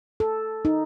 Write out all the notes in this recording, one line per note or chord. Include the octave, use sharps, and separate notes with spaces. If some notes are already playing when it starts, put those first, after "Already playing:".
A4
D#4